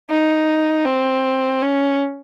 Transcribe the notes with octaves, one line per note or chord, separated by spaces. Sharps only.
D#4
C4
C#4